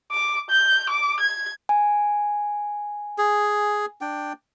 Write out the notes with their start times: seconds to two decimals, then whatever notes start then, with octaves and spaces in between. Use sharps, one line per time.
0.12 D6
0.50 G6
0.90 D6
1.20 G#6
1.69 G#5
3.18 G#4
4.01 D4 G5